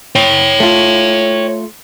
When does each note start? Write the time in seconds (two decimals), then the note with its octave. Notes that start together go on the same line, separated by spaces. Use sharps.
0.15 C#5 G5
0.60 A3 F4